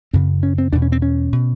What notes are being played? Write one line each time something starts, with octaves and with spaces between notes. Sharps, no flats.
F#2 C#3 C4
C#4
C4
E2 B2 D4
C#4
C4
C#4
B2